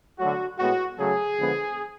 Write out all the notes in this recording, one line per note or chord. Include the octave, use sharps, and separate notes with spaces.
D3 F#3 A3 F#4
A2 G#3 B3 F#4
C#3 F#3 A3 G#4
D3 F3 G#3 B3